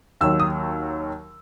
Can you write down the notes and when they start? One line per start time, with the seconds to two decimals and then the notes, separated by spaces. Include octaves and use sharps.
0.21 D#2 D#3 F#3 E6
0.40 D#6